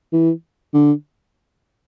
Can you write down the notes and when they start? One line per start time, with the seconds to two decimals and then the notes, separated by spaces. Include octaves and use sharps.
0.13 E3
0.74 D3